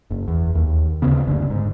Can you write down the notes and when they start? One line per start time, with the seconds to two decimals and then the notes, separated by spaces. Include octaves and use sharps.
0.11 F#1
0.28 E2
0.55 D#2
1.02 D2 C#3 B3
1.27 F#1 D2 D3
1.50 G#2